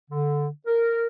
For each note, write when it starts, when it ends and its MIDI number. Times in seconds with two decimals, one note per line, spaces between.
0.11 0.47 50
0.67 1.07 70